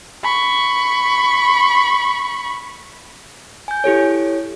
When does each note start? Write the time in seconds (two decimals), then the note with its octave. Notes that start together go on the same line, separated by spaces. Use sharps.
0.24 B5 C#6
3.68 G#5 G6
3.84 E4 G4 A4 C#5